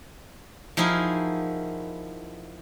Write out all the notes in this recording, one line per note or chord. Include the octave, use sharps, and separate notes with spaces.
F3 D#4 E4 F#4 G#4 A#4